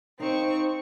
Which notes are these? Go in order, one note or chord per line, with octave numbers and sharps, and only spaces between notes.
C4 D#4 F5 C#6